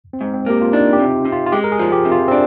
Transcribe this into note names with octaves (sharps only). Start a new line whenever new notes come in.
C4
G#2
C4
A#3 G4
F4
D4 D#4
G4
C3
C3
F4
F4
G#3 G4
A#4
G#4
F3
G4
C3
F4
C4
D4